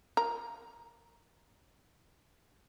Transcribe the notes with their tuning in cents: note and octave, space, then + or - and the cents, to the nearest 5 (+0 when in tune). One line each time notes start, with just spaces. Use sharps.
F4 +0 A#4 +0 A#5 +0